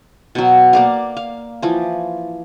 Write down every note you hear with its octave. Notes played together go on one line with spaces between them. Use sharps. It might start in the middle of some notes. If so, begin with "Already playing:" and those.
B2 F#3
A#3 D5 F5
F5
E3 F3